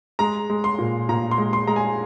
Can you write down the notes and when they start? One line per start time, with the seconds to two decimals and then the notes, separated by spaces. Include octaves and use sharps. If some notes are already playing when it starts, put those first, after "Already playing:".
0.19 G#3 A#5
0.50 G#3
0.64 C6
0.79 A#2
1.09 A#2 A#5
1.31 C6
1.38 G#3
1.53 C6
1.67 G#3 A#5
1.76 G#5